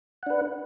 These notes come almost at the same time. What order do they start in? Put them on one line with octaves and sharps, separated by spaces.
F#5 D4 B4